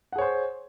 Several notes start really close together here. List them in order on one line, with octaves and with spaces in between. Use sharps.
F#5 G#4 C#5 C5